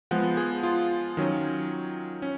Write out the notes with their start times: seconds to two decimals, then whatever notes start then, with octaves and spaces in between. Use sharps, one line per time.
0.11 F3 G#3 B3 F#5
0.37 G#4
0.63 F4
1.17 D#3 F#3 C#4
2.22 C#4